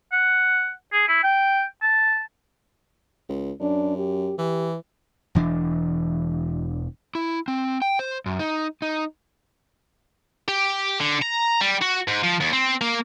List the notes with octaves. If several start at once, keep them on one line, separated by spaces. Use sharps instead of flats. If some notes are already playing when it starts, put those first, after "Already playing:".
F#5
G#4
E4
G5
A5
C#2
F#2 D4
G4
E3 G4
E1 E3 D4
E4
C4
G5
C5
F#2
D#4
D#4
G4
D3
A#5
G3
F#4
G#2
F3
D#2
C4
A#3